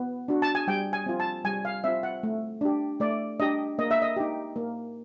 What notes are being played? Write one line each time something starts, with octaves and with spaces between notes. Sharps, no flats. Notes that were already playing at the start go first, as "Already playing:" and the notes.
Already playing: B3
D4 F#4
A5
G#5
G3 G5
G#5
C4 F4
A5
G3 G#5
F5
C4 F4 E5
F#5
A3
D4 G4
A3 D5
D4 G4 D#5
A#3 D#5
E5
D#5
D#4 G4
A#3